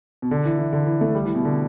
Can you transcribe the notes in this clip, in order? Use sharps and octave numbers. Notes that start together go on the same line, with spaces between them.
B2
D3
E3
E3
D3
E3
A3
G3
E3
B2
D3